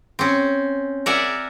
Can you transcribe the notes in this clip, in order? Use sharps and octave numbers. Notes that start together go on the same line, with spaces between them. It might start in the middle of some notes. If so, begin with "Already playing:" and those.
C4 C#4
A#4 D5 E5 F#5 G#5